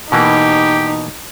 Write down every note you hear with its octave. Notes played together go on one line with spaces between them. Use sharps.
B2 E3 A#3 D#4 G4